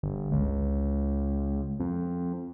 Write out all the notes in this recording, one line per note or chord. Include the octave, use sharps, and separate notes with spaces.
G1
C#2
F2